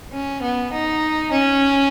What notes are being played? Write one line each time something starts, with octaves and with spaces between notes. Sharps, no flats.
C#4
B3
D#4
C#4